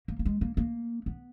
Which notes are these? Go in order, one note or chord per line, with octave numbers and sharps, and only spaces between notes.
A#3
A#3
G#3
A#3
A#3
B3